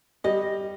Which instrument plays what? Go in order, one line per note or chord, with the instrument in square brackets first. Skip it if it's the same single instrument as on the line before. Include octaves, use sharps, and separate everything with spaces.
[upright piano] G3 [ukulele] D#5